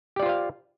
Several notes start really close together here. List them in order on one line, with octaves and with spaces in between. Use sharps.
G4 D5 F4 C5 F5